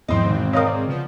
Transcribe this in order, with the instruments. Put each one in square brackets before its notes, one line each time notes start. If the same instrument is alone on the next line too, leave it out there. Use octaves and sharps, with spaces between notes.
[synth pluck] E2 [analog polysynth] G#2 C4 [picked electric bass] F3 B3 [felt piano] D#5 C6
[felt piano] G#1 [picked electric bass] B2 D#3
[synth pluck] A#4 D#5 [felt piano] C#5 F5 D#6
[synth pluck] D5
[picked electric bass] C#3 [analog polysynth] F3 B3